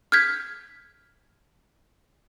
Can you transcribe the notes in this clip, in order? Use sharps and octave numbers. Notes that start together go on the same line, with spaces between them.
F6 G6 G#6 B6